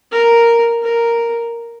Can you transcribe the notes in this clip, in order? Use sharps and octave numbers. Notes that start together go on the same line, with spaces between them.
A#4
A#4